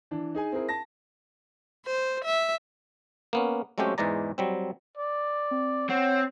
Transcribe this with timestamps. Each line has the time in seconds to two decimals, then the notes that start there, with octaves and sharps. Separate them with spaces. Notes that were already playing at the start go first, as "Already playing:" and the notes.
0.11 E3 D4
0.35 D#4 G#4 G#5
0.52 C4 E4 G#4 A#4
0.69 A5 A#6
1.86 C5
2.24 E5
3.33 A#3 B3 C#4
3.78 F#3 G#3 A3 C4 C#4 G4
3.98 E2 G#2 E3 G#3 D5 A#5
4.38 F#3 G3 C4
4.98 D5
5.51 C4
5.90 C4 C#5 F#5